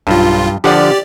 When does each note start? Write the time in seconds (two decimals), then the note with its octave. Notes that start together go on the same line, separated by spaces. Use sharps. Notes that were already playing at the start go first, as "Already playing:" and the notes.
0.07 B1 G2 F4
0.64 D3 F3 G4 D5 F#5